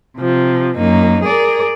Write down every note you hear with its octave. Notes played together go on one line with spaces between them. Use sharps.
C3 F3
F#2 A#3 D#4
G#4 A#4 D5